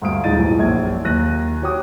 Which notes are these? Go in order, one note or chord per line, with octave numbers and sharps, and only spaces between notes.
D2 G2 F5 D#6 D7
D#1 G#3 D#4 A6 D#7
B1 E2 A2 E3 F3
A#1 F#2 G#6
D#2 F#6 A#6 D#7
F#4 G4 C#5 G5 D6 D#6